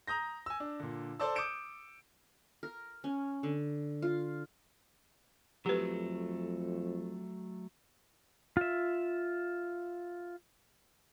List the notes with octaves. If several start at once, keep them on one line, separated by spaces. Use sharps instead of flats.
A#5 D#6 G6 A#6
G#5 E6
D4
A#2 D3
A4 C5 D5 A5 E6
D6 D#6 G6 C#7 D7 E7
A#4
C#4
D3
F4
F2 F#3 A3 G4 B4
F4 E5